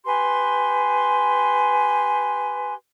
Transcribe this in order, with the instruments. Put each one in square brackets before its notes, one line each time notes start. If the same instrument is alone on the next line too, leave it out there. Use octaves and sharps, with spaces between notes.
[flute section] G4 B4 G#5 C6